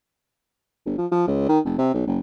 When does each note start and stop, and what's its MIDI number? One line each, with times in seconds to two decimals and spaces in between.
0.86 0.93 31
0.98 1.06 53
1.12 1.24 53
1.27 1.44 37
1.49 1.59 51
1.65 1.76 29
1.78 1.91 48
1.94 2.04 35
2.07 2.19 30